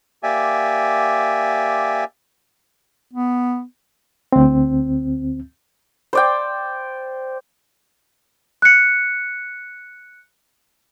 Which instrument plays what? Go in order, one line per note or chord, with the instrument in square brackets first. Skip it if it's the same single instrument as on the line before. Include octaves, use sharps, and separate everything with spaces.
[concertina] A#3 G4 D5 E5 G#5
[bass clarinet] B3
[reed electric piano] D2 C4
[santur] C5 D5 G5
[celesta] F#6 C#7